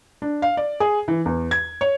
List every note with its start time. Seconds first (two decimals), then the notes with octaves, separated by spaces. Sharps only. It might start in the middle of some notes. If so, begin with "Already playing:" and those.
0.22 D4
0.42 F5
0.57 D5
0.80 G#4
1.08 E3
1.26 E2
1.51 G#6
1.81 C#5